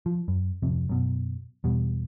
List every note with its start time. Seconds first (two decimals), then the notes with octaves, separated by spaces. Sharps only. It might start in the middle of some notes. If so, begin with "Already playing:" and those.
0.06 F3
0.28 F#2
0.63 D1 F2 C3
0.89 F#2 B2
1.64 E2 B2 G3